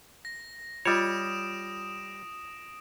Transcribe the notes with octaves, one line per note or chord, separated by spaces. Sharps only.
A#6
G3 F4 C#5 D#5 D#6 D7 E7